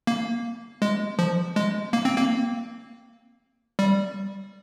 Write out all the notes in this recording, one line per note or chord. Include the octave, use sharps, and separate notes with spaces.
A#3
G#3
F3
G#3
A#3
C4
A#3
G3